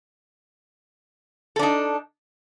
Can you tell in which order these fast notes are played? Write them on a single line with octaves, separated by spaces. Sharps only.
A4 D4 D#4